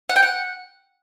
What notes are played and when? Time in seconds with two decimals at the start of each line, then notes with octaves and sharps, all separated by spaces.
0.09 F#5
0.16 G5
0.22 F#5